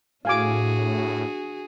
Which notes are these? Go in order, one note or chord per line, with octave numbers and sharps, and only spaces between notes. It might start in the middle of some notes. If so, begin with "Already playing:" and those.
A2 D4 F#4 G#4 F5 G#5 D6